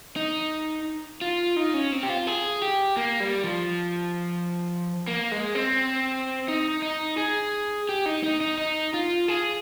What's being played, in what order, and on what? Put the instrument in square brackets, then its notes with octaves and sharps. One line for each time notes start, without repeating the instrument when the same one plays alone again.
[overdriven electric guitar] D#4
F4
D#4
C#4
C4
G4
F4
G#4
G4
A#3
G3
F3
A#3
G#3
C4
D#4
D#4
G#4
G4
D#4
D#4
D#4
D#4
F4
G#4